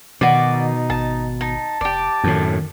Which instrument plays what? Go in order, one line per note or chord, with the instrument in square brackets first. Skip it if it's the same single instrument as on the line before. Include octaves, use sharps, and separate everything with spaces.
[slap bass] B2 [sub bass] D#3 [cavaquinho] F#4 D5
[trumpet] D#4
[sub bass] G#1 [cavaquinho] A5
[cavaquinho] D#4 [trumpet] A5
[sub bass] F1 [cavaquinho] G4 D5
[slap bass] F#2 A2 [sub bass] D#3